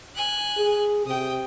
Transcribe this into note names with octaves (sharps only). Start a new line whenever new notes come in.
G#5 F#6
G#4
C3 G5 D#6